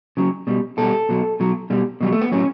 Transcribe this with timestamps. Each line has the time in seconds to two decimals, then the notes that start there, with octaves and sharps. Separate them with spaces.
0.17 C#3 F#3
0.47 B2 G3
0.78 B2 G3 A4
1.09 B2 F#3
1.40 B2 F#3
1.70 B2 G3
2.01 B2 F#3 G3
2.13 A3
2.21 B3
2.32 A2 F#3 C#4